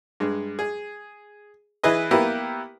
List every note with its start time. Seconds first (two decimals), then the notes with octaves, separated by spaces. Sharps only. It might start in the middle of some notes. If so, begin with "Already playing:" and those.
0.20 G2 G#3
0.59 G#4
1.83 E3 E4 G#4 B4 D#5
2.11 A#3 B3 E4 G4 A#4 B4